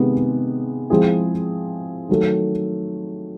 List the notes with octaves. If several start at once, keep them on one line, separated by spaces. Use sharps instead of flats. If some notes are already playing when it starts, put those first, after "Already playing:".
Already playing: C3 D#3 G#3 B3
F3 G#3 C4 E4 G#4
D#3 F#3 A3